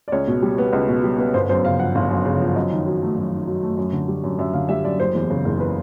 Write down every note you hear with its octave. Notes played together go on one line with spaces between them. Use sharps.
D5
C#2 C#5
B2
G3
B3
C#2
B2
G3
B3
G1 C5
F#2 C5
C#3 F5
F3 F#5
G1 F5
F#2
C#3
F3
F#2 D#5
D#3
F#3
A3
F#2
D#3
F#3
A3
F#2
D3
G3
F#2
F#2 E5
D3 F5
G3 E5
F#2 D5
F#1 C5
E2
C#3
F#1
B4